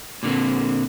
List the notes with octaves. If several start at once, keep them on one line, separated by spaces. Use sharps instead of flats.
A#2 D3 A#3 C4